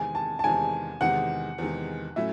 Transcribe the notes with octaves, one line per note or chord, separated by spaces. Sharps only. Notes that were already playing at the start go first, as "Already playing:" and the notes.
Already playing: E2 C3 D#3 G#3 G#5
A5
A5
E2 C3 D#3 G#3 G#5
E2 C3 D#3 G#3 F#5
E2 C3 D#3 G#3
A2 F#3 A3 C#4 E5